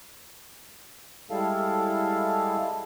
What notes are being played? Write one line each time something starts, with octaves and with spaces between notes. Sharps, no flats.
G3 G#3 E4 A4 F5